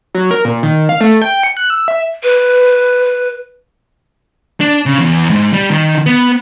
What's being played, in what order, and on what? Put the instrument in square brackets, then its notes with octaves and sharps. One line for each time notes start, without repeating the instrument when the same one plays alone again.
[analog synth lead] F#3
A#4
A#2
D#3
F5
A3
G5
C#7
F#6
E6
E5
[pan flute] B4
[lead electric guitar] D4
C#3
E2
G#2
G3
D#3
B3